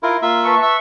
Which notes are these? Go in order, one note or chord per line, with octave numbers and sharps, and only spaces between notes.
E4 F4 A#4
A#3 F4 E5
B4 A5 C#6
E5